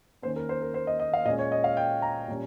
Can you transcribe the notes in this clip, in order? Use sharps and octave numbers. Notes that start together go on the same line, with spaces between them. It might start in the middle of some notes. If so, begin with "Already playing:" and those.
D#3 A#3 C#4 C5
A#4
C5
A#4
C5
D#5
D#5
F5
A#2 G#3 C#4 D#5
C#5
D#5
F5
G5
A#5
A#2 G3 C#4